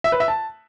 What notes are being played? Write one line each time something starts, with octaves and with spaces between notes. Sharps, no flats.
E5
B4
E5
A5